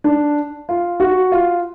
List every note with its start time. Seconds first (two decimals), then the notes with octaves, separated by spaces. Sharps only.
0.04 D4
0.69 F4
1.00 F#4
1.32 F4